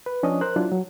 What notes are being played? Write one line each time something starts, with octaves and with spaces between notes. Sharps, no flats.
B4
F3 C#4 D4 D#5 D#6
A#4 C5 F#6
F#3 D4 E4 F4
F#3